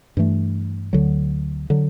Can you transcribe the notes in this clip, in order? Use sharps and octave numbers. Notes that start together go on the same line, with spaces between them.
G2 E3 A3
D2 D3 F#3
D3 F#3